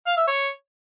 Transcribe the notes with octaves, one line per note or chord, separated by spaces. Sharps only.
F5
E5
C#5